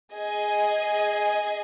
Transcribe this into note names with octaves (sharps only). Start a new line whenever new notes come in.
G#4 D#5 G#5